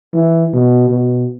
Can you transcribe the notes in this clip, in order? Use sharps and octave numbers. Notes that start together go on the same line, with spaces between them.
E3
B2
B2